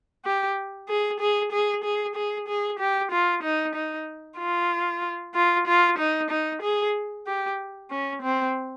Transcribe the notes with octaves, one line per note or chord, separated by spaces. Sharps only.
G4
G#4
G#4
G#4
G#4
G#4
G#4
G4
F4
D#4
D#4
F4
F4
F4
D#4
D#4
G#4
G4
C#4
C4